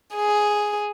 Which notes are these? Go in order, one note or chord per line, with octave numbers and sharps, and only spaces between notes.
G#4